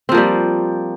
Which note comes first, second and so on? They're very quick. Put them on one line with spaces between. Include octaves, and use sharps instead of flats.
C4 F3 A#3 G3